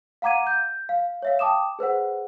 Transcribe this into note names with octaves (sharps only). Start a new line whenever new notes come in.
F5 F#5 A#5 D6 G#6 D#7
G6
F5
C#5 E5 F5
G5 A5 D6 D#6 E7
G#4 B4 C5 F#5